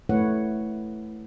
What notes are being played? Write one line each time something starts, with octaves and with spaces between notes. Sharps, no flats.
A3 E4 B4 C#5 F#5